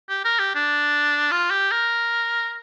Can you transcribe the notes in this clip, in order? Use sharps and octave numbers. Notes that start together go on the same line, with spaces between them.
G4
A#4
G4
D4
F4
G4
A#4